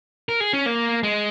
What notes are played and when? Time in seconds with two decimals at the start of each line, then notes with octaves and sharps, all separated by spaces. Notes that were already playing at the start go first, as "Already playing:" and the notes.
0.29 A#4
0.40 G#4
0.53 C#4
0.66 A#3
1.03 G#3